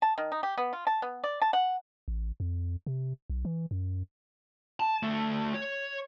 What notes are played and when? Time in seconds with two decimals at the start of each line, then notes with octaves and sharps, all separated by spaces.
0.02 A5
0.18 D#3
0.32 D#4
0.43 G4
0.57 B3
0.73 F4
0.87 A5
1.02 B3
1.24 D5
1.42 A5
1.53 F#5
2.08 A1
2.40 F2
2.86 C3
3.30 B1
3.45 E3
3.71 F#2
4.80 A5
5.03 D2 A3
5.54 C#5